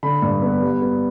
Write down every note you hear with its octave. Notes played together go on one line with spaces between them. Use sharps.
D3 B5
G2
B3
G3
B3